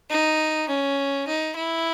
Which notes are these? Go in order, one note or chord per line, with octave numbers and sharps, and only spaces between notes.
D#4
C#4
D#4
E4